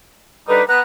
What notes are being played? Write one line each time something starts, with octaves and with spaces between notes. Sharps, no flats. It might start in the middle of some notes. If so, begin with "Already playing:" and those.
D3 G3 D#4 B4
B3 A#5 F#6